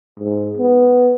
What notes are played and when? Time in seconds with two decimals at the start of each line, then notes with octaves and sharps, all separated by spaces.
0.20 G#2
0.57 B3